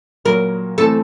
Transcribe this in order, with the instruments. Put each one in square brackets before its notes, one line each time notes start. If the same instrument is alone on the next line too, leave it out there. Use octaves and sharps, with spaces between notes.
[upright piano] A#2 F#3 A#3 [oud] A#4
[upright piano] E3 A3 C4 [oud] A4